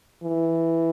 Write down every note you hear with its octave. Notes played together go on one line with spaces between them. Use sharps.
E3